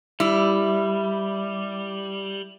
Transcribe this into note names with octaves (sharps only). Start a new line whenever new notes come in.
G3 E4